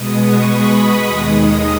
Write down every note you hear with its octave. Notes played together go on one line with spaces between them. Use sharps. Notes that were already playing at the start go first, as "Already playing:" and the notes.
Already playing: B2 G#3 B3 D#6
C#6
B5
D#6
D#2 D#3 G#3 D#4 D#6